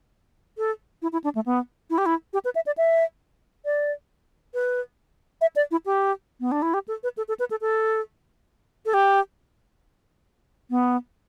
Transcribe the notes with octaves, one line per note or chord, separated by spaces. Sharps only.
A4
E4
E4
D4
A3
B3
E4
G4
E4
G4
B4
E5
D5
E5
D5
B4
E5
D5
E4
G4
B3
D4
E4
G4
A4
B4
A4
A4
B4
A4
A4
A4
G4
B3